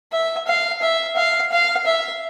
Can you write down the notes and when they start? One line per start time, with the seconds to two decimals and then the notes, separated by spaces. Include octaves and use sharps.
0.12 E5
0.47 F5
0.82 E5
1.16 F5
1.51 F5
1.86 E5